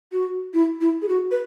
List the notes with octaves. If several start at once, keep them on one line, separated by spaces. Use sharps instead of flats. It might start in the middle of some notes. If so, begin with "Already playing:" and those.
F#4
E4
E4
G#4
F#4
B4